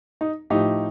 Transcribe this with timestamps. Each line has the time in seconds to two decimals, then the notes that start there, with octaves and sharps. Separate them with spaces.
0.21 D#4
0.50 A2 F3 D#4 G4